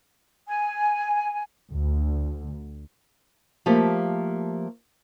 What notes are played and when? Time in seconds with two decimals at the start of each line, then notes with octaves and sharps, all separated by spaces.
0.48 G#5
1.71 D2
3.66 F3 A3 A#3 G4